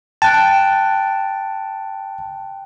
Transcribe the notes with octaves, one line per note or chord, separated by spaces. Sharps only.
G5 A5 F#6 D7